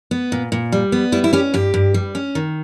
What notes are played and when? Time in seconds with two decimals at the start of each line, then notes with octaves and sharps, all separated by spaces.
0.11 B3
0.32 A#2
0.52 A#2
0.72 G3
0.92 B3
1.12 G3 E4
1.24 E4
1.33 C#4 G4
1.54 G2 G4
1.74 G2
1.94 G3
2.15 C#4
2.35 D#3